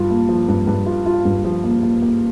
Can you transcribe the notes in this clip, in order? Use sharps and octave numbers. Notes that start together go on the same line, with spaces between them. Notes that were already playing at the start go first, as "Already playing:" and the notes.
Already playing: G2 F4
A#3
F3
G2
G2
F4
F4
G2
F3
A#3
A#3
A#3